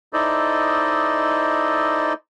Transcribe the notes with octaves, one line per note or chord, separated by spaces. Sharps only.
D#4 E4 A4 C5 D5 D#5